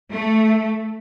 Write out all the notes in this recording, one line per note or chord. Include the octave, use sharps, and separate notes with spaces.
A3